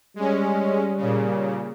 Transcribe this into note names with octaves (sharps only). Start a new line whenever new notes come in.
G3 G#3 C#4
A#2 C#3